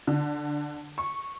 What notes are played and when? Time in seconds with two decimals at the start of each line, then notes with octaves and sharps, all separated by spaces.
0.07 D3
0.98 C#6